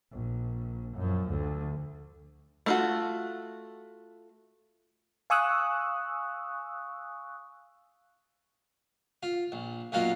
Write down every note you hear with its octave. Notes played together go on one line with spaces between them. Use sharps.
A#1
F#2 F3
D2
A3 F4 F#4
F5 G#5 C#6 D#6 E6 F#6
F4
A#1
B1 F#2 F#3 A#3 F4 F5